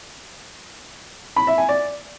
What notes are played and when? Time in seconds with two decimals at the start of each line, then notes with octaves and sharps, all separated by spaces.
1.36 B5
1.47 E5
1.58 G#5
1.69 D5